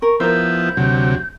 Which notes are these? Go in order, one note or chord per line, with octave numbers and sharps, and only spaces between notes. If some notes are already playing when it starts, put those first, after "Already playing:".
A#4 C#6
F3 B3 E4 A#4 C5 G6
D2 C3 F#3